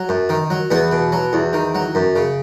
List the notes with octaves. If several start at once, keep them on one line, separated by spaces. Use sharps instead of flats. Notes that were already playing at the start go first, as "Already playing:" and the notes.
Already playing: F#3
F#2
D#3
F#3
E2 B3
B2
F#3
E2
D#3
F#3
F#2
C#3